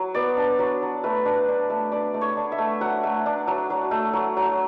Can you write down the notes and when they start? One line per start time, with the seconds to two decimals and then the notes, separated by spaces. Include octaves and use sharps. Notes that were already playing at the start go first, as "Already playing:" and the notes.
Already playing: F#3
0.14 B3 D5
0.37 D4
0.59 F#3
0.82 F#3
1.04 A3 B4
1.25 D4
1.48 D4
1.70 A3
1.92 D4 D5
2.14 A3
2.21 C#5
2.37 D4
2.52 E5
2.58 A3
2.81 F#3 F#5
3.03 A3
3.26 D4
3.47 F#3
3.70 F#3
3.91 A3
4.13 F#3
4.37 F#3